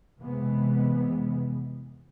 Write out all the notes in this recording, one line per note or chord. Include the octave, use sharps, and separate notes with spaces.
F1 C3 E3 G#3 B3